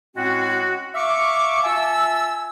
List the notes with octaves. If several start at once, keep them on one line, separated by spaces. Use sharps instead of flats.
A2 G#3 C4 C#4 F#4
E5 F5 C#6 D6
F4 E5 G#5 A5 E6